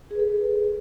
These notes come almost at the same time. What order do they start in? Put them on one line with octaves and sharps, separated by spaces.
G#4 B4 A4